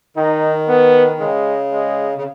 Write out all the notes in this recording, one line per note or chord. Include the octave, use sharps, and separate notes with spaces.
D#3 D#4
B3
C#3 G#3
G#3
C#3